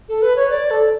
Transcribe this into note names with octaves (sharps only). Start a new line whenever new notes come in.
A4
B4
C#5
D5
A4